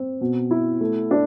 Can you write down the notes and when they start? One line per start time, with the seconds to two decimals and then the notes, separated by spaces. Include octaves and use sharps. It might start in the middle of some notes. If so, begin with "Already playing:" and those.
Already playing: C4
0.21 B2
0.51 E4
0.81 A3
1.11 D4